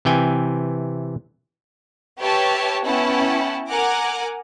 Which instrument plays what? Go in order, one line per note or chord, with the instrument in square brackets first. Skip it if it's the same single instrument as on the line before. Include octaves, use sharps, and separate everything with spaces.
[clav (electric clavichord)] C3 E3 G5 G#5
[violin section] G4 B4 C#5 E5 A5
B3 C#4 E4 F#5 G5 A5
A#4 F#5 G#5 A#5 D6